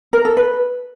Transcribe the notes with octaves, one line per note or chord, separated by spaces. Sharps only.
A#4
A4
B4